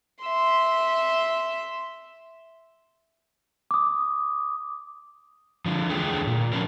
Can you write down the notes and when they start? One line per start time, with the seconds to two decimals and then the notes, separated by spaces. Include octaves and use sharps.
0.25 E5 C6
3.71 D6 D#6
5.66 D3 F3
5.89 E2 D3 A3 G#4 G5
6.27 A#2
6.52 D3 F3 A3 C#4 D4 A#4